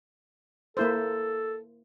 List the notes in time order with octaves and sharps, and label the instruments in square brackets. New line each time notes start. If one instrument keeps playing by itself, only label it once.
[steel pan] A#3 E4 C5 [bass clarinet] A4